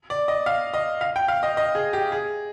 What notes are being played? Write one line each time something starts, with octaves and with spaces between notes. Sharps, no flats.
D5
D#5
F5
D#5
F5
G5
F5
D#5
D#5
G#4
G4
G#4